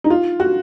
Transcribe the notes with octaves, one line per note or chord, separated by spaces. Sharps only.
D#4
F4
F#4